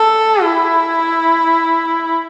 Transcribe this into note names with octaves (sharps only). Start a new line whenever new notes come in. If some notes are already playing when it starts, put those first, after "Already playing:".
Already playing: A4
E4